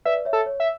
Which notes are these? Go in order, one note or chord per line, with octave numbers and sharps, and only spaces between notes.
B4 D5 E5
C#5 E5
A4
C#5
E5